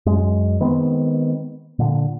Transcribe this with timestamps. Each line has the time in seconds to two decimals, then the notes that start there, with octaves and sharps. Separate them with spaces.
0.06 F#2 G#3
0.60 D#3 G#3 B3 C4
1.79 A#2 D3